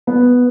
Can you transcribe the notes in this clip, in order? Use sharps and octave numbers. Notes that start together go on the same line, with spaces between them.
B3